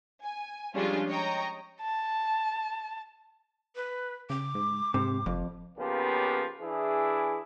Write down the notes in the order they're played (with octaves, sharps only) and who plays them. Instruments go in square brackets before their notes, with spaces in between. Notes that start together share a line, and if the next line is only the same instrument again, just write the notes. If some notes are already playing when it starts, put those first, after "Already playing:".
[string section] G#5
F3 G3 G#3 C#4 D4 F4
C#5 D#5 G5 A#5
[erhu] A5
[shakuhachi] B4
[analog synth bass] C#3 [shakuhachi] D6
[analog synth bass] G#2
[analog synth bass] G#2 [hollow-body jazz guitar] C3
[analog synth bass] F#1 [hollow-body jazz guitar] F2
[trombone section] C#3 F3 A#3 B3 C#4 G4
E3 D4 E4 G#4